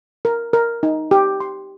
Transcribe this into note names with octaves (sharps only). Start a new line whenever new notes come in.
A#4
A#4
D#4
G4
C6